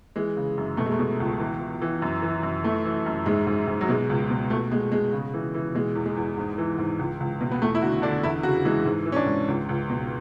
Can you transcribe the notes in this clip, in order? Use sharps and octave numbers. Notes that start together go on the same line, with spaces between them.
E3 G#3
C#3
F#2
B2 A3
G#3
A3
B2
C#2
E3
E3
E3
F#2
E3
F#2
E3 A3
E3
F#2
G#2 G#3
G#2
G#2
F#3
B2 G#3
C#2
B2
B2 A3
B2 G#3
B2 G#3
C#3
E3
E3
B2 G#3
E2
G#3
E2
G#2
E3
G#2
C#2
C#2
B2
B3
E2 A3
E4
D3 F#4
D3 D4
E2 E4
C#3 F#4
E3 G#3
G#2
E3
C#4
D4
G#2
C#2
C#2
B2